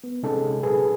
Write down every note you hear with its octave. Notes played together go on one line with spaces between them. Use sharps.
B3
C3 G#3 C#4 D#4 G#4 A4
A#2 F#3 G#4 A4 B4